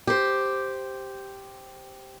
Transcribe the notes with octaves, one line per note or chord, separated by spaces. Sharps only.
G4 C5